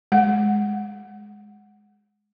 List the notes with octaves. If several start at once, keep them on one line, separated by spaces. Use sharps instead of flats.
G#3 F#5